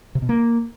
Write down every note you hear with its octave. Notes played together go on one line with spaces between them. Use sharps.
C3
B2
A#3